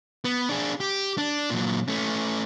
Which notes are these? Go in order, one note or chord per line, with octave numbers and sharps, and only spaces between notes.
B3
D4 G#4
G4
D4
A#2 F#3
A3 C#4